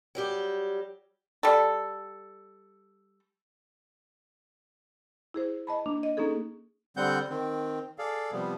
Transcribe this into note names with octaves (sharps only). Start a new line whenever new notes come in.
F#3 G3 G4
G3 A4
E4 G#4 C5
D#5 A5 B5
A#3 D4
D#5
A#3 C#4 D#4 G#4 A4
D3 G3 C4 F#5 G6
D#3 C4
G#4 A4 D5 F5
C3 F3 G3 B3